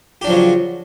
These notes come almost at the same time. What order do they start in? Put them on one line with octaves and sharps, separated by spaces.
G4 D4 F3 F#3 C#3